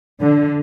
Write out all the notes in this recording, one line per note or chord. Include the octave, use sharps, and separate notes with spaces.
D3